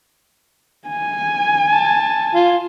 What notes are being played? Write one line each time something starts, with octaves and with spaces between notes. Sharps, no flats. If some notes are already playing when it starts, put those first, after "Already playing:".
G#5
A5
F4